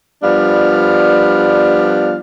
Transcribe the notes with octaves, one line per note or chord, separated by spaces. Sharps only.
F3 G3 B3 D4 F5